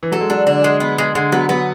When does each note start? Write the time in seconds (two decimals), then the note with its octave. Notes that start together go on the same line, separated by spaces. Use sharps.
0.03 E3
0.12 F#3 A4
0.21 G#3
0.30 F#3 D4
0.46 D3 D4
0.64 G#3
0.80 B3
0.98 G#3
1.15 D3 G#3
1.32 F#3 B3
1.49 F#3 B3